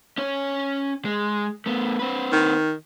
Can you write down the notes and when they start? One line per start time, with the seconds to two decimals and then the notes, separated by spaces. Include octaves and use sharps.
0.18 C#4 C#5
1.05 G#3
1.66 A3 B3
1.99 C4 B4
2.32 D#3